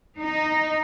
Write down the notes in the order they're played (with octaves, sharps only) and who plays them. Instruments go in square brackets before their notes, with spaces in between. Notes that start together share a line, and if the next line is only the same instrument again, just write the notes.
[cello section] D#4